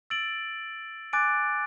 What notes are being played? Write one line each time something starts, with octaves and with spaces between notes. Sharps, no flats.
E6 A6 D7 F#7
G#5 D6 F#6 A6 D7